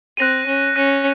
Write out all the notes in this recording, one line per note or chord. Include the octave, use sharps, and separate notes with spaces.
C4 F#6 A#6 D#7
C#4
C#4 F#6 A#6 D#7